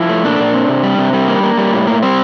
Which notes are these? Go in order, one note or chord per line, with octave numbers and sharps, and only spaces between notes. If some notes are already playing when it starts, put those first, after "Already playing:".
Already playing: F3 E4
A3
A#2 D4
A#2
C4
C3
G3
C3
G3
A#3
A#3
G3
A2
A#3
G3 C4